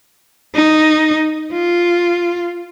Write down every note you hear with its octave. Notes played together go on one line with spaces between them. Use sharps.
D#4
F4